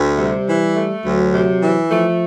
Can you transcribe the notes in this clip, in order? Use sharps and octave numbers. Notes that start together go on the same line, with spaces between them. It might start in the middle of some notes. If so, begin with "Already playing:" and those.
Already playing: D2
C3 G3
E3
A3
D2 F#3
C3
E3
F3 A3